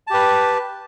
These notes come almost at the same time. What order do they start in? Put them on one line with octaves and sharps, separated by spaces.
A5 G4 B4